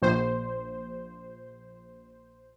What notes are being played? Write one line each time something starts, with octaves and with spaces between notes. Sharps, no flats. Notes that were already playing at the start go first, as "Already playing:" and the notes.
A#1 C5